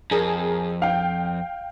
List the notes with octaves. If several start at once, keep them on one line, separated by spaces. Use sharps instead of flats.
F2 G#4 A#4
F5 G5